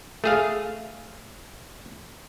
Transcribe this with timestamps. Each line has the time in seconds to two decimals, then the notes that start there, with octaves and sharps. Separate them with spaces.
0.24 A3 G#4 F5